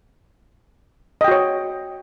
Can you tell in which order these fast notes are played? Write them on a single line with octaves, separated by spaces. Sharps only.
D#5 G5 F#4 C#5